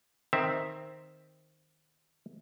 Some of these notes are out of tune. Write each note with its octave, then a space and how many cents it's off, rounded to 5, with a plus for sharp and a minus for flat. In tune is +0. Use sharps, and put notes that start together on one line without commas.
D#3 +0 C4 +0 E5 +0